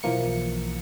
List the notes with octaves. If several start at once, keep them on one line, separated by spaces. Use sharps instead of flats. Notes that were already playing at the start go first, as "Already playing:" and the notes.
B1 E3 F3 A#3 C#7